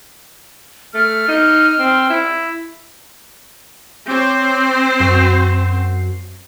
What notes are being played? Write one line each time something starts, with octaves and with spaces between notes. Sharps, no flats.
A3 F6
D#4
C4
E4
C4 C5 C#5 D6 G6
F#2 F#4 C7